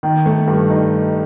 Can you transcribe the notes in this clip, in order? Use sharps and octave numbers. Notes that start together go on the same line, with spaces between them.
D#3
A3
G2
D#4